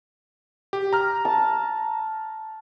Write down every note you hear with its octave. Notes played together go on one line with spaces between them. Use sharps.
G4
A#5 F6
A5